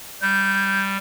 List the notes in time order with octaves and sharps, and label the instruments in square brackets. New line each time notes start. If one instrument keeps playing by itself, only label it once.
[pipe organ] G3 [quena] G6